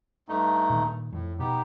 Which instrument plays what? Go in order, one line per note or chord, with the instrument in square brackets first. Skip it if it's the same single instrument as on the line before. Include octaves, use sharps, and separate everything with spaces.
[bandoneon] G2 A3 D#4
[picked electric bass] A#2 D#3
[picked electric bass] F2 [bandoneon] A2
[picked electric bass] B2 [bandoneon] B3 D#4 G4